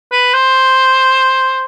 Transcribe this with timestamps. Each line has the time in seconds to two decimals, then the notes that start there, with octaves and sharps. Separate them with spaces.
0.12 B4
0.34 C5